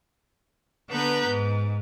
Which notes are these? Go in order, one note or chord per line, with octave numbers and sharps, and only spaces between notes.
D3 B3 B4 A#5 G6
G#2